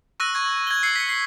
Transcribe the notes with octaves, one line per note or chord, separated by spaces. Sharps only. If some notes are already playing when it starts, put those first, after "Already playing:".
C#6 E6 F#6 A#6 D#7
C#6 G#6
G#6 G7
E6 C7 C#7
B6 C#7
C7